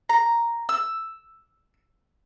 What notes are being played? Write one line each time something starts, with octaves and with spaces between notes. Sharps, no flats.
A#5
E6